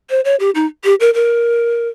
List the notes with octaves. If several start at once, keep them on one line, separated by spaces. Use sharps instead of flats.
C5
C#5
G4
D#4
G4
A#4
A#4